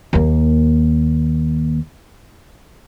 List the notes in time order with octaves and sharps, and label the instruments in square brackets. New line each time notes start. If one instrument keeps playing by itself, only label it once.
[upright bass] D#2 A#3